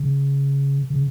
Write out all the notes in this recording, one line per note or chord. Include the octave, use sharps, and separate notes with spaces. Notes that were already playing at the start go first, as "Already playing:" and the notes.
Already playing: C#3
C#3